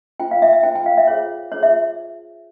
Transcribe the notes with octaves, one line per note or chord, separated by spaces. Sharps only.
F4 C5 G5
F5
E5
E5
F4 C5 G5
G5
F5
E5
F4 G#4 C5 C#5
F4 G#4 C5 C#5
E5